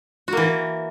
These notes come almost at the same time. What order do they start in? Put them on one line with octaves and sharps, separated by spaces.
F#4 A#3 E3